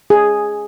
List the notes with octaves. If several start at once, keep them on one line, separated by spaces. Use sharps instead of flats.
G#4